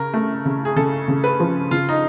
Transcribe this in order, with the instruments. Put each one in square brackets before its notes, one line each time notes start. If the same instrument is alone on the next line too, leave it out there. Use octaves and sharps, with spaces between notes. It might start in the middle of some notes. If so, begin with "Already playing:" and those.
Already playing: [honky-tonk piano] C#3 [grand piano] A#4
[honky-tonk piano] A3
C#3
[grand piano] G#4
[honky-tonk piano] C#3 [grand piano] A4
[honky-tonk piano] C#3
[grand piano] B4
[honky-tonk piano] F3
[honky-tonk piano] C#3 [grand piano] F4
[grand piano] D#4